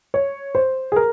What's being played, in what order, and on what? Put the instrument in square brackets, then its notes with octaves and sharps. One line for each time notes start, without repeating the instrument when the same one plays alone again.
[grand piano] C#5
C5
G#4
A#4